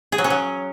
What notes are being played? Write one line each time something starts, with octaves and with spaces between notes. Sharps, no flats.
G#4
F#3
C#4
F#3